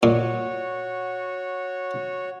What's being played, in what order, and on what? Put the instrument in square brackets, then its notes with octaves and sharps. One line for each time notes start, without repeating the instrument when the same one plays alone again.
[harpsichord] A#2 [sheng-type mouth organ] F#4 C#5